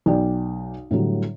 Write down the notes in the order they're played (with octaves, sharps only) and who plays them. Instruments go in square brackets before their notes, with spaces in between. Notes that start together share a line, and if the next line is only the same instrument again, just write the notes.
[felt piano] B1 D5 G5
A2 D3 F#3 G3